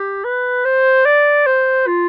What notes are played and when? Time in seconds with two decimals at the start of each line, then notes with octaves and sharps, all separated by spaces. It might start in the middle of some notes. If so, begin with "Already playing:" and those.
Already playing: G4
0.24 B4
0.65 C5
1.06 D5
1.46 C5
1.87 F4